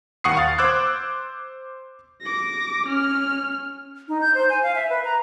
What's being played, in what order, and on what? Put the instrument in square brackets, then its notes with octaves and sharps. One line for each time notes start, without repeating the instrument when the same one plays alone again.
[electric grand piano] D#2 F#5 C#6 D#6 C7
F5 A6
C5 D6 E6 F#6 G#6
[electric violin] D6 A#6
C#4 F6
[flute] D#4
G6
C5
G#5
F5
E5
B4
A#5